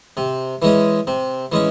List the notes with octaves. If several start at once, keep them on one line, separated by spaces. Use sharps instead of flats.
C3
E3 G#3 C#4
C3
E3 G#3 C#4